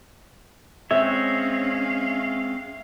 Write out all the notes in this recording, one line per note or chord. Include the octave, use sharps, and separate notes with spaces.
G#3 C4 C#4 C#5 E5 F5